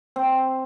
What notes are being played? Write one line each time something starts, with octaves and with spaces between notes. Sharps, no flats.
C4